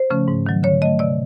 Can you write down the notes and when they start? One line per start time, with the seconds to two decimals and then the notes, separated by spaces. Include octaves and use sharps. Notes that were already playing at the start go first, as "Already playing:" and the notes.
Already playing: C5
0.10 C#3 F3 A3 C#4
0.28 G#2
0.46 D#3 F#3
0.63 D3 C#5
0.82 F#3 A3 D#5
0.99 C3 D5